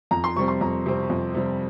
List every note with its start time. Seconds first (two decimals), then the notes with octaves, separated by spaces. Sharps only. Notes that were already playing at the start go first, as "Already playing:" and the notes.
0.11 F2 A#5
0.24 C6
0.36 C3 G3 C4 C#6
0.48 C6
0.61 F2 A#5
0.86 C3 G3 C4
1.10 F2
1.34 C3 G3 C4